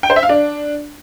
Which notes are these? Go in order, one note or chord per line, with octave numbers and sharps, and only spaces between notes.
G5
C5
E5
F5
D4